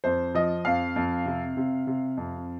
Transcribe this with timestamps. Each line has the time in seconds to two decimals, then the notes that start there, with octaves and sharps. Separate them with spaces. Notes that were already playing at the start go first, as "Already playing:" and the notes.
0.04 F2 C5
0.35 F3 D#5
0.65 F2 F5
0.96 F2
1.26 C3
1.57 C3
1.87 C3
2.17 F2